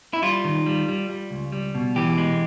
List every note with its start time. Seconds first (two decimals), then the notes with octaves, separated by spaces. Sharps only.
0.13 E4
0.22 G3 F4
0.45 D#3
0.66 G3
0.88 G3
1.10 G3
1.31 C#2
1.52 G3
1.75 B2
1.96 E3 G4
2.18 G#3